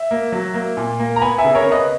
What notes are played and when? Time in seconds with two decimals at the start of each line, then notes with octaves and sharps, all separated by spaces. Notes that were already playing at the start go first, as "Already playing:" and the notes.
Already playing: E5
0.11 A#3
0.32 F#3
0.54 A#3
0.77 A#2
0.99 A#3
1.16 A#5
1.22 B3 G#5 B5
1.38 E5 G#5
1.44 C#3
1.55 A#4 C#5
1.66 C#3
1.72 B4 D#5